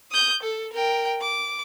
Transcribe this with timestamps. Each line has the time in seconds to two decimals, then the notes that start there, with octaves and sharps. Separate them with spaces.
0.12 D#6 G6
0.43 A4
0.73 A#4 G5
1.21 D6